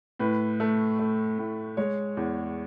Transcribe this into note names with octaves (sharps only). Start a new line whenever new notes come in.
A2 B4
A3
A3
A2
G#3 C#5
E2